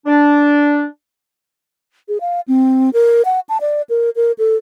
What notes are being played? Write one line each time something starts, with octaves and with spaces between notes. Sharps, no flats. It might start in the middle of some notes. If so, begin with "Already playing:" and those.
D4
G#4
F5
C4
A#4
F#5
A5
D5
A#4
A#4
A4